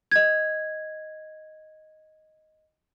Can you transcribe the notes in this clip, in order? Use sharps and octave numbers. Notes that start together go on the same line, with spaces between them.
D#5 G#6